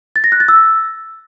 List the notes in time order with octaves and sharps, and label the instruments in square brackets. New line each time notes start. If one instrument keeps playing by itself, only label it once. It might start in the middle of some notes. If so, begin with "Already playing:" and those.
[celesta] A6
A#6
F#6
A6
E6